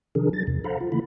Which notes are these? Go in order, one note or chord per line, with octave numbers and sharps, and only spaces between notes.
C3 D#3 F3 D4 G#4 A#4
F#3 A6
E2 C3
A4 C5 F5 F#5 A#5 B5
F4
C#3 E3 A3 A#3 E4 B5